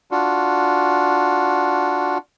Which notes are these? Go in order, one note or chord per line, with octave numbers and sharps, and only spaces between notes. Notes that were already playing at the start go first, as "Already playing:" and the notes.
D4 F4 F#4